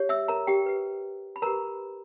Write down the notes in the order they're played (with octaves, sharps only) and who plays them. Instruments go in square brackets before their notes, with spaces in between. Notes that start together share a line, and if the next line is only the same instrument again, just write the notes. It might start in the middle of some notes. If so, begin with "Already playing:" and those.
Already playing: [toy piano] G4 C#5
E5 E6
A#4 A#5
G4 G5
G4 B4
B5
G4 A#4 B4 A#5